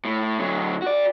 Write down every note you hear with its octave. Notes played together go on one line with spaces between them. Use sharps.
A2
D3 F#3
F#4 D5